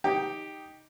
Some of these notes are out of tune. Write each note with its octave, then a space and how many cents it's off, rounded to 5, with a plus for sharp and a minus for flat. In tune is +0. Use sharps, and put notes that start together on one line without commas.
D#4 +0 G4 +0